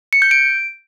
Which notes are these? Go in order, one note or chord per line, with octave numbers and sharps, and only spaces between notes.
C#7
G6
D7